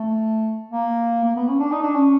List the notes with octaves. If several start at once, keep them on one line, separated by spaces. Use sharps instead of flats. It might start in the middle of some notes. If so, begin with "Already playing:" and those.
Already playing: A3
A#3
A#3
B3
C#4
D4
D#4
D4
C#4